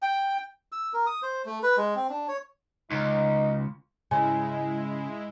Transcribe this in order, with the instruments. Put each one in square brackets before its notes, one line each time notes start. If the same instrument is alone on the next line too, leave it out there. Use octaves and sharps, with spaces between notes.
[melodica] G5
E6
A#4
D#6
C5
A3
B4
G#3
C4
D4
C#5
[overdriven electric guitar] C#2 [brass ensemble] D#4
[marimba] G#2 [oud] C#3 [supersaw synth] G#3 E4 [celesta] G#5